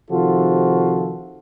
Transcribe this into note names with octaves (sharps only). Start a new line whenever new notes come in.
C3 D#3 F3 F4 F#4 A4